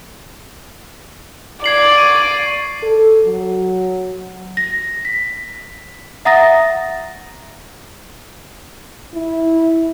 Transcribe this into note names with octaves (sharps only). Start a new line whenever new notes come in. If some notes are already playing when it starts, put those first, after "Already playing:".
D5 G#6 C7 F#7
C#6 D#7 F#7
A4
F#3
A#6
B6
E5 F#5 A#5 D#6 A6 A#6
E4